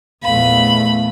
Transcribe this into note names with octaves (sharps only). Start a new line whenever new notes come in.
A#1 E2 A3 F5 B5